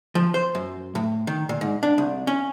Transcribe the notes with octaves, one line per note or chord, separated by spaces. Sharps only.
F3
C5
F#2
A2
D#3
A#2
G#2
D4
C2
C#4